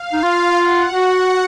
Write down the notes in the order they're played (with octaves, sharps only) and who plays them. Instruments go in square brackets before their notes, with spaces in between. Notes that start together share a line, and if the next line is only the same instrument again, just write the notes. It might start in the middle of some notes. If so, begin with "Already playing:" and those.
Already playing: [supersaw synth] F5
[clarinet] D#4
F4
[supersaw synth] F#5
[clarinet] F#4